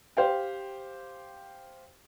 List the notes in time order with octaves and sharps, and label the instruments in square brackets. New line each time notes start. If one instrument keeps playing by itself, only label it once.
[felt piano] G4 C5 F5 G5